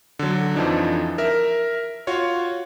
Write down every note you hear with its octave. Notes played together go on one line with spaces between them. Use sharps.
D3 F#3
F2 E3 F3 D4 D#4
A#4 E5
F4 F#4 C#5